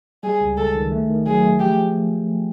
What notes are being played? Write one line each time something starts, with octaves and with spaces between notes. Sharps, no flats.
G3 G#4
C#2
C#2 A4
D#3
A3
D#3
F#3 G#4
A3
F3 G4
F3